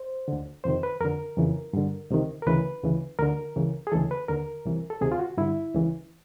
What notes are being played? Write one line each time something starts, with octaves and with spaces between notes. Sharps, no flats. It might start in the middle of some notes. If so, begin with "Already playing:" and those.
Already playing: C5
D2 D3
F2 C3 D#3 C5
B4
F2 D3 A#4
F2 C#3 E3
G2 D3
C#2 C3 D#3
A#4
D2 C#3 E3 B4
D2 C#3 E3
D2 D3 A#4
C#2 C#3 E3
G#4
D2 C#3 E3 A4
B4
D#2 D3 A#4
C2 C3 E3
A4
D2 C3 D#3 G#4
F4
F#4
G2 D3 E4
C#2 C#3 E3